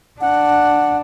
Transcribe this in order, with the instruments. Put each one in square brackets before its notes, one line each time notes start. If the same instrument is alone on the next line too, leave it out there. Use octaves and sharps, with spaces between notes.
[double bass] D4 [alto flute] F#5